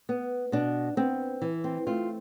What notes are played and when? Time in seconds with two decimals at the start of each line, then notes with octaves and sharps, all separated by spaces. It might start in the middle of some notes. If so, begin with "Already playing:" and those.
0.09 B3
0.52 B2 D4
0.97 B3 C4
1.42 E3
1.64 C4
1.86 A3 C4 F4